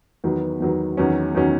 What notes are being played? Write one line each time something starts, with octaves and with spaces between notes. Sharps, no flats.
E2 D#3 F#3 B3
E2 D#3 F#3 B3
E2 D#3 F#3 C#4
E2 D#3 F#3 C#4